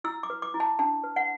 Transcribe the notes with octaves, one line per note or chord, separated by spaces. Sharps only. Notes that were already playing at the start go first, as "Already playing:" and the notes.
E4 E6
D6
B4
D6
E4
A5
D4 A5
B4
F#5